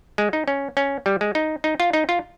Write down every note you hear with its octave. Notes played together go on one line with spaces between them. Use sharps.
G#3
D#4
C#4
C#4
G3
G#3
D#4
D#4
F4
D#4
F4